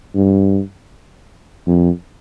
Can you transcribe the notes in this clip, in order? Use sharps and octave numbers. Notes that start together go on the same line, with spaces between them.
G2
F2